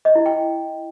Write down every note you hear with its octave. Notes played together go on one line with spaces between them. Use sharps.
D#5
E4
G5